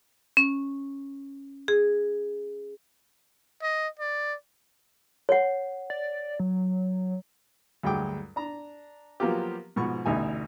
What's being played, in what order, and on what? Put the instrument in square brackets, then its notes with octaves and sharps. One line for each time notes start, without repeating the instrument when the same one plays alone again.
[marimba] C#4
G#4
[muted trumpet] D#5
D5
[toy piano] C#5 F#5
[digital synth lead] D5
F#3
[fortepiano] D2 G2 F#3 G#3 G5 D6
D4 A#5
F3 F#3 A#3 B3 F4 G4
G#2 B2 F3 C#6
A1 D2 B2 D#4 E5 G#5